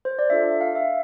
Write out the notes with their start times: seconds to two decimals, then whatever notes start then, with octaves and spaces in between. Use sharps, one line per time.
0.05 C5
0.19 D5
0.30 D4 F4 A4 E5
0.61 F5
0.75 E5